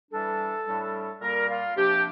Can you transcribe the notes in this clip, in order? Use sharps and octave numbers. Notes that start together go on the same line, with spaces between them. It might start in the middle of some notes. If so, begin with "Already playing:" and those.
E3 G3 D4 A4
A2 G3 D4
A#2 G3 A#3 A#4
F4
C3 F3 A#3 D4 G4